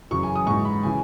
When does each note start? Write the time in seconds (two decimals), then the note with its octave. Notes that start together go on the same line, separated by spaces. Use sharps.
0.11 F#2 C#3 E3 C#6
0.23 G#5
0.36 D#6
0.47 G#2 E3 C#6
0.65 B5
0.83 C#3 E3 G#5